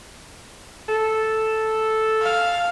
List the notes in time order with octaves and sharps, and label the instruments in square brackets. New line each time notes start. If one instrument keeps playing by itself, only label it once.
[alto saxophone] A4
[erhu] F5